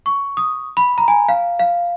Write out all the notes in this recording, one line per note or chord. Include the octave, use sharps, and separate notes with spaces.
C#6
D#6
B5
A#5
G#5
F5
F5